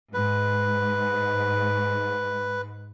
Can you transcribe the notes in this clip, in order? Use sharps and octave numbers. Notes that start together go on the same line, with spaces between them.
G#2 B4